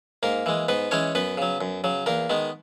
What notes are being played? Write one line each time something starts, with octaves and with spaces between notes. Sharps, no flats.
G#2 A#3 A#4
E3 G#3
G#2 B3 B4
E3 G#3 C#4 C#5
F#2 B3 B4
C#3 F#3
F#2
C#3 F#3
E2 A#3 A#4
D#3 G#3 B3